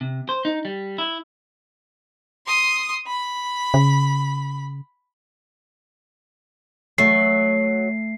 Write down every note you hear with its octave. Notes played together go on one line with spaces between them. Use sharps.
C3
C5
D#4
G3
E4
C6 D#6
B5
C#3
F#3 A3 C7